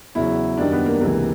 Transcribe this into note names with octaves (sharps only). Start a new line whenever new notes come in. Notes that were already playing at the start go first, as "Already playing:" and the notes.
E2 C#3 F#3 E4
F#2 D#3 G3 D4
B3
A#3
C#2 C3 E3 A#3